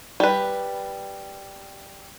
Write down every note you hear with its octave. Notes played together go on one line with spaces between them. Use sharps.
G3 B4